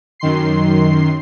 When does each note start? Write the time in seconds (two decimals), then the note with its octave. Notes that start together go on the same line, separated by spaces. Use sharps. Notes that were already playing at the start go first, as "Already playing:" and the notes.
0.20 F#2 D#3 C6 C7